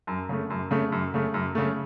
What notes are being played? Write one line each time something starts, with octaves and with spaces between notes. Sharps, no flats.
F#2
C#3 A3
F#2
C#3 A3
F#2
C#3 A3
F#2
C#3 A3